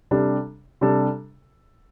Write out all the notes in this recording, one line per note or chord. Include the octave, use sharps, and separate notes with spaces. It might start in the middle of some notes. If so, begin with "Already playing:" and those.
C3 G3 D4 A4
C3 G3 D4 A4